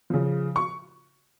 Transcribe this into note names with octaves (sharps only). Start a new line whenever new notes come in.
C#3 F3
C#6